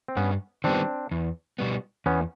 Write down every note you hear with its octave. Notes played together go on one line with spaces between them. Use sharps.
C4
G2 B3 C#4
D#3 G3 B3 C4 D4
E2
B2 G3 B3
E2 B3 C#4